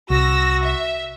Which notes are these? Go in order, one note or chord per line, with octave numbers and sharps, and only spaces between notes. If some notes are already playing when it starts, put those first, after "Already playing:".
C2 F#4 E6 A#6
E5